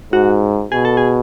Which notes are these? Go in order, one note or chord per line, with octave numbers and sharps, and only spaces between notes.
G#2 F#4
B2 G#4
A4
G#4